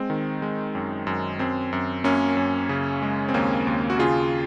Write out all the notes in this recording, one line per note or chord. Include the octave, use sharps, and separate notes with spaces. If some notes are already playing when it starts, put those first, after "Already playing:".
Already playing: G#3 C4
D#3
G#3
F#2
F#2
F#2 C4
F#2
F#2 A#3 C#4
F#2
C#3
G#3
C4
D#2 A#3 C#4
D#2
F#4
C#3 F4 G#4